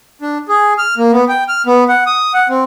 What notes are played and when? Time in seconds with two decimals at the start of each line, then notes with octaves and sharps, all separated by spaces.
0.22 D4
0.49 G#4
0.78 F6
0.97 A#3
1.12 B3
1.29 G5
1.48 F6
1.66 B3
1.88 F#5
2.06 D#6
2.34 F#5
2.49 C4